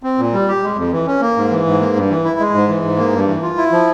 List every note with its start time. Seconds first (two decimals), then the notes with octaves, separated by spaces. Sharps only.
0.03 C4
0.18 A#2
0.33 G3
0.48 G4
0.63 G#3
0.77 F2
0.92 E3
1.07 C#4
1.21 A#3
1.36 G#2
1.51 E3
1.66 G#2
1.80 A#3
1.96 G2
2.10 E3
2.25 E4
2.40 G#3
2.54 G#2
2.69 E3
2.84 G#2
2.98 A#3
3.13 G2
3.28 E3
3.42 F4
3.57 E4
3.72 F3